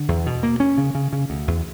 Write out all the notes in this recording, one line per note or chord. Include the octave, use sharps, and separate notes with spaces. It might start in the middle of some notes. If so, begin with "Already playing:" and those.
Already playing: D3
E2
B2
A#3
C#4
C#3
C#3
C#3
D2
E2